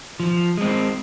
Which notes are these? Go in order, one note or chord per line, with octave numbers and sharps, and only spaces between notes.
F3
G#3 C4